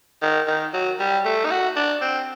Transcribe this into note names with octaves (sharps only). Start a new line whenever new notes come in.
D#3
D#3
F#3
G3
A3
D#4
F#4
D4
C4